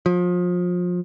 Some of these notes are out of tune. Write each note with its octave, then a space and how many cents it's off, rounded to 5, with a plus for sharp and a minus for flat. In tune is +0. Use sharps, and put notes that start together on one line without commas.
F3 +30